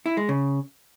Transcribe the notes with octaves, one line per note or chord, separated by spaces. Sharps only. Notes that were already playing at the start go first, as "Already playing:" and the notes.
E4
G#3
C#3